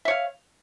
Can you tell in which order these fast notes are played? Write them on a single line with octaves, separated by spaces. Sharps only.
E5 C#5 F5